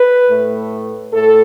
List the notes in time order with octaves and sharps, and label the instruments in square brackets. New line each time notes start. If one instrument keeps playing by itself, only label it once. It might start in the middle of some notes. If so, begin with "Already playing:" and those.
Already playing: [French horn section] B4
A2 A3
A2 A3 A4